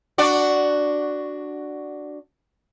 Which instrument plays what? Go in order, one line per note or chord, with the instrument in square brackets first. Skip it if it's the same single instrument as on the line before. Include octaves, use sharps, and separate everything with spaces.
[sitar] D4 F#4 D5